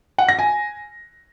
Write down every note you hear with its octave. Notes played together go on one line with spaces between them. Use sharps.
F#5
A#6
G#5